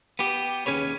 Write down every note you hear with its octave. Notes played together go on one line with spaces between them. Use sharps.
B3 G4
D#2 C#3 C#4 G#4 B4 C#5